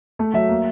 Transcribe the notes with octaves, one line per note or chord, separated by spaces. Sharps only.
A3
F#3 E5
A#3